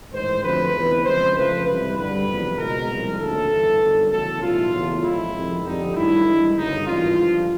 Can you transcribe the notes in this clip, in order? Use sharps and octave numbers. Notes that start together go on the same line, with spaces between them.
A1 G#2 D#3 G#3 C5
F2 D3 F#3 A3 B4
E2 C3 D#3
F2 C#3 E3 G#3 C5
F2 C#3 F3 A3 B4
C2 C3 E3 G#3 B4
G2 D3 G3 B4
F#1 E2 C3 F3
C#2 B2 G#3 A#4
C2 A#2 F3 G#3
D#2 D3 F#3 A3 A4
G1 G2 E3
G1 F#2 D#3
E2 C#3 F#3 A3 A4
B1 A2 E3 G3 F4
F#1 E2 C#3 F#3 A3
A1 A2 F3 G#3 E4
F2 C3 D#3 G#3
F2 D3 G3 D#4
G2 D#3 F#3 A3 E4
G2 E3 G#3
G1 F#2 C#3 D#4
G#1 G2 E3 F4
G2 D3 F3